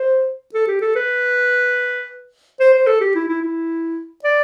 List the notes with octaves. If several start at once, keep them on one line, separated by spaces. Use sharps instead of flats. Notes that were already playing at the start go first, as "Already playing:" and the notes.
Already playing: C5
A4
G4
A4
B4
C5
C5
A4
G4
E4
E4
E4
D5